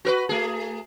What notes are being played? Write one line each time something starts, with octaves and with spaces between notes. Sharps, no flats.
F#4 A#4 B4
A3 G#4